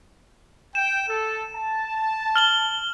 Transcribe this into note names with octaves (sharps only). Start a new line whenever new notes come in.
G5 E7
A4
A5
F6 F#7 G7